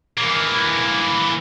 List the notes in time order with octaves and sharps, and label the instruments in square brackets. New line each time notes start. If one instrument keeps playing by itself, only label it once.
[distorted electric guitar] E3 A#3